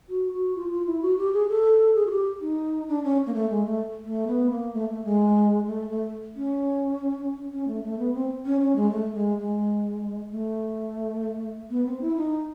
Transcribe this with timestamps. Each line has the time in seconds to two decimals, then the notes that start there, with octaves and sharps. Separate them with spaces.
0.09 F#4
0.33 F#4
0.56 F4
0.71 F4
0.87 E4
1.02 F#4
1.18 G4
1.33 G#4
1.49 A4
1.95 G#4
2.07 F#4
2.10 G4
2.41 D#4
2.88 D4
3.04 C#4
3.26 A#3
3.34 A3
3.50 G#3
3.65 A3
4.04 A3
4.27 B3
4.50 A#3
4.74 A3
4.89 A3
5.05 G#3
5.67 A3
5.90 A3
6.36 C#4
7.53 C#4
7.68 A3
7.84 A3
7.99 B3
8.14 C4
8.45 C#4
8.61 C#4
8.76 G#3
8.91 A3
9.15 G#3
9.38 G#3
10.31 A3
11.70 B3
11.86 C4
12.01 E4
12.17 D#4